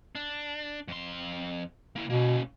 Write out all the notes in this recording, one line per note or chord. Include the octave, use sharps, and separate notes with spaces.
D4
F2 C6
A#3 E4
B2 A#3 C#4